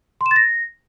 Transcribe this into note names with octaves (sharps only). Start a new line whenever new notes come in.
C6
E7
A6
A#6